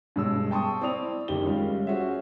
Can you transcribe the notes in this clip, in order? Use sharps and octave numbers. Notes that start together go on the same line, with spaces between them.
G2 B2 G#3 C#5 E6
G5 A5 C6 C#6 D#6
C4 E4 D5 D#6 F7
F#1 D#3 G4 G7
G3 G#3 C#4 F4
C#4 F#4 G#4 C5 E5